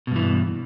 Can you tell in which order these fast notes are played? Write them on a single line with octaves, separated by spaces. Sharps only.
B2 G2 E3